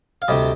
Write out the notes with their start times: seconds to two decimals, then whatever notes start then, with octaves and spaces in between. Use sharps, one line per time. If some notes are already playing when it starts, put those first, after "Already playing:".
0.22 F5
0.28 D2 C3 G3 D#5